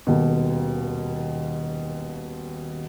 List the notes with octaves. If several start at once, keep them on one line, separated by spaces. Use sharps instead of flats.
D#1 D#2 B2